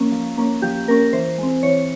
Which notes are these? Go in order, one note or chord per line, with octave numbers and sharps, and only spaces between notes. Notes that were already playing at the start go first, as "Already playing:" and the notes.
Already playing: F3 A#3 C#4
F3
A#3 C#4
F3 G4
A#3 C#4 A#4
E3 C5
G#3 C4
E3 C#5